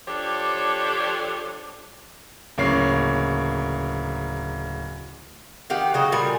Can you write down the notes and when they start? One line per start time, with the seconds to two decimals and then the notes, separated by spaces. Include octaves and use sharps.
0.08 F3 D4 G4 A4 C#5
2.58 D1 C#3 A#3 C#5 C7
5.70 D#3 G4 F5 F#5
5.94 C#3 F#3 F#4 D#5
6.12 A#2 G3 G#5